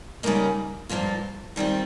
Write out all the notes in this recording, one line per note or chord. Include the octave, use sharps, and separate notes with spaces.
C#3 G3 A#3 D#4
G2 F3 A#3 F4
D#3 G3 C4 F4